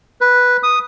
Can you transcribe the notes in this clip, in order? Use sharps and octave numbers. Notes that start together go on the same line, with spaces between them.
B4
D#6